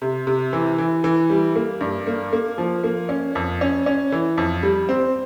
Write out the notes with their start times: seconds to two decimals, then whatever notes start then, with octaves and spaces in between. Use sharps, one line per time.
0.02 C3
0.27 C3
0.53 E3
0.78 E3
1.04 E3
1.30 G3
1.56 A#3
1.81 G2
2.07 A#3
2.33 A#3
2.58 F3
2.84 A#3
3.09 C#4
3.35 F2
3.61 C#4
3.86 C#4
4.12 E3
4.38 F2
4.63 G3
4.89 C4